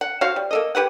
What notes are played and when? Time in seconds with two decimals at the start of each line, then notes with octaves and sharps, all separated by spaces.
0.01 F#5
0.21 F#4 C5 C#5 F5
0.36 G3
0.51 A#3 A4 D#5
0.75 G4 B4 C#5 F#5